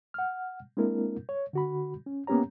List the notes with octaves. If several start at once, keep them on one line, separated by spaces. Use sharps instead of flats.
F#5 F6
G#3 A#3 C4 D4 E4 A#4
C#5
D3 F#4 B5
C#4
A#3 B3 C#4 G4 C#5 A#5